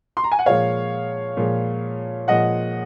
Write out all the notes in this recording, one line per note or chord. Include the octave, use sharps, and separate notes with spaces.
C6
A#5
G#5
F#5
A#2 F3 G#3 C#5 F5
A#2 F3 G#3
A#2 F3 G#3 D#5 F#5